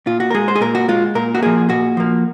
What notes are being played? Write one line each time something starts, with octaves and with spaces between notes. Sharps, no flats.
A#2 F4
F#4
A#4
G#3 G#4
C5
G#4
A#2 A#4
F#4
G#3 F4
A#2 A#4
F#4
F3 A#3 G#4
A#2 F#4
F3 A#3